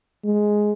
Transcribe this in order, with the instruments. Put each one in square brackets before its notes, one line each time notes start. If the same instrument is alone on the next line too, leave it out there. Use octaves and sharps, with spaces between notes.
[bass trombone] G#3